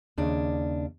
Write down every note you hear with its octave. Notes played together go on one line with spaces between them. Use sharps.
D#2 C#3 D4